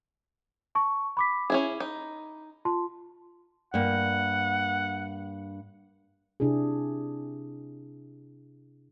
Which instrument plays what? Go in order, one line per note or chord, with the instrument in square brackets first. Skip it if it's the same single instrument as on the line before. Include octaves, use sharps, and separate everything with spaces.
[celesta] A5 C#6
B5 D6 B6
[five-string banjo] C#4 E4 G#4
D#4
[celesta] F4 A5 C6
[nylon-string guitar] G2 A#3 [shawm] F#5
[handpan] C3 D4 E4 G#4